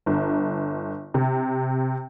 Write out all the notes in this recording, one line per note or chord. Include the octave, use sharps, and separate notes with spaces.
G1
C3